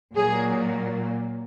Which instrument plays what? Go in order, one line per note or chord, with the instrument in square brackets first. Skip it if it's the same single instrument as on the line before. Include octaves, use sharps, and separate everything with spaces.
[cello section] A#2 F#3 A#3 G#4